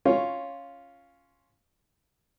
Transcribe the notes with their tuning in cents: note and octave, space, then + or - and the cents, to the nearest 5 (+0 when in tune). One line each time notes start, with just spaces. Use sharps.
C#4 +0 F4 +0 C#5 -10